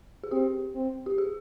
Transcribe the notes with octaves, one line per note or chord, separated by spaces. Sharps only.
G#4
C4 G4
C4
G4
G#4